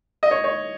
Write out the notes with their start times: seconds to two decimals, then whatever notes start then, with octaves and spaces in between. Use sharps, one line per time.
0.23 D#5
0.31 C#5
0.44 C#5